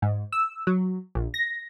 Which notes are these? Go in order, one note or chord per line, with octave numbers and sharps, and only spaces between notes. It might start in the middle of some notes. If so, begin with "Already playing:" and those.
G#2
E6
F#3
A#1
A#6